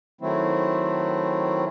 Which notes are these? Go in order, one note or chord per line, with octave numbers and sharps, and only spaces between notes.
D#3 F#3 A3 C4 E4